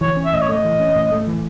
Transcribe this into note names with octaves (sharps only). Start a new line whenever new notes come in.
E3 C#5
C#4
E5
A2 D#5
C#5
A3 D#5
E3
C#4
A2
A3
E3